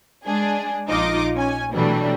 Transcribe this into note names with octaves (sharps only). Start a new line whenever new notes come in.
G#3 D4 G#4
A#1 D#4 F4 D#5 D6
C#4 G#5
B2 E3 F#3 G3 A3 D4